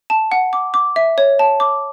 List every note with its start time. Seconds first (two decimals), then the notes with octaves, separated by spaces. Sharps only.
0.10 A5
0.32 F#5
0.53 D6
0.74 D6
0.96 E5
1.18 C#5
1.39 A5
1.60 D6